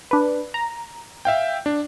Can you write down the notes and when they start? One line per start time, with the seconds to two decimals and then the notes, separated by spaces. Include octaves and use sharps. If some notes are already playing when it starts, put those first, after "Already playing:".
0.11 D4 B4
0.54 A#5
1.25 E5 F5 G5
1.66 D4